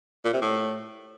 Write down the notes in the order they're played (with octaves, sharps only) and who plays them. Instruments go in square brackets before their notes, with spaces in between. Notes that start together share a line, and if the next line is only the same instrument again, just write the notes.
[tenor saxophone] A#2
C3
A2